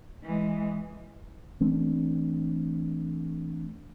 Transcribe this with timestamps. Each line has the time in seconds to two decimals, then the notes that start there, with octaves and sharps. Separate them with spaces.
0.24 E3 G#3
1.61 E3 A3 C4 D4